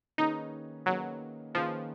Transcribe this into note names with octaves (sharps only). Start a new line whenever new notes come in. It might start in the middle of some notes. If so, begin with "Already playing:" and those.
D#3 A#3 C#4 D#4 G#4 B4
D#3 F#3 A#3 C#4 G#4 B4
D#3 F3 A#3 C#4 G#4 B4